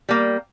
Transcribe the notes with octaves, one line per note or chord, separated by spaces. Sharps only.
G3 A#3